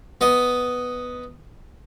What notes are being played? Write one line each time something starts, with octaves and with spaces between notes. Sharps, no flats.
B3 D#5